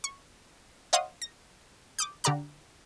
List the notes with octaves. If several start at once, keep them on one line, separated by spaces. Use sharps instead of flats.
C#6
C#5 D#5 F5 F#5 C6 D#6
A#6
D6 D#6 G6
D3 G4 D5 A#5 F#6